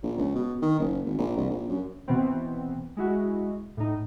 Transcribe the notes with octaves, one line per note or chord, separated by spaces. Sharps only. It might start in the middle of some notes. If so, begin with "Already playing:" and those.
A#1
C#2
B2
D#3
F#1
G#1
A#1
C2
A#1
F#2
B2 E3 B3 C4
G#3 E4 F#4
A2 D#4